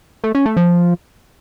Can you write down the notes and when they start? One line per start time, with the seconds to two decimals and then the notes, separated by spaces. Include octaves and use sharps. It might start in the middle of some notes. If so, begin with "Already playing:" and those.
0.24 A3
0.35 C#4
0.46 A3
0.57 F3